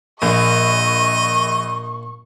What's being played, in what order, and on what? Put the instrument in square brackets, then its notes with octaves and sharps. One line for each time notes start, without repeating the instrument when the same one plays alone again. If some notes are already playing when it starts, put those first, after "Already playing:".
[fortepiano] A#1 [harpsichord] A#2 [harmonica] D#5 [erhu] C#6